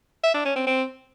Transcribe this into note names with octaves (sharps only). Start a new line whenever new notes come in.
E5
D4
C#4
C4
C4